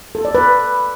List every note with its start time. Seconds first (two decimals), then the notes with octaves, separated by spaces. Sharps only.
0.15 A4
0.25 D5
0.35 B4